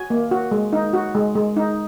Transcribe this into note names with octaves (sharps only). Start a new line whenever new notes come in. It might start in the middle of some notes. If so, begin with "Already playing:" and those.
Already playing: F#4 G#5
A#3
F#4
G#3
D#4
F#4
G#3
G#3
D#4